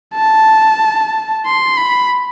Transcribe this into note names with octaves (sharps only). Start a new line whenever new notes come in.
A5
C6
B5